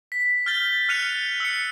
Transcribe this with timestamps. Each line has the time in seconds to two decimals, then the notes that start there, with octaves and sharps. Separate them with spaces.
0.12 B6
0.46 F6 G6 A6 G7
0.89 F6 F#6 C#7 D#7 F7
1.40 E6 C#7